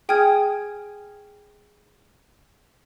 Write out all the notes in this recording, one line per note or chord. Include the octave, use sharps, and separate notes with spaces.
G#4 G5 G#5 D#6 F6 G#6